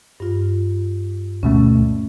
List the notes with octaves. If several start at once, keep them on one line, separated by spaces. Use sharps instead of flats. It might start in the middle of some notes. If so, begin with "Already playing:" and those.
G2 F4
D2 B2 A3 C#4